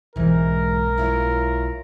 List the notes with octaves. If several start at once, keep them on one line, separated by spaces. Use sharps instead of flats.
B1 G#2 E3 G#3 A#4
E4 F4 C#5